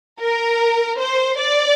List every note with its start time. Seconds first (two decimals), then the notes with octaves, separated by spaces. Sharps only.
0.21 A#4
1.00 C5
1.40 D5